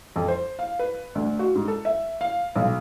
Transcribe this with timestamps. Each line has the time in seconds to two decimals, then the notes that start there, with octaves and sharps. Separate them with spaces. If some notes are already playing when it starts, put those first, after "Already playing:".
0.16 F2
0.28 C5
0.59 F5
0.79 B4
1.15 D2
1.39 F#4
1.55 G#2
1.68 A4
1.85 E5
2.21 F5
2.56 B1